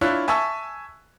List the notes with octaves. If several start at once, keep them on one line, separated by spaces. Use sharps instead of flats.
D4 E4 F4 C#5 F#6
E5 G#5 A5 C#6 E6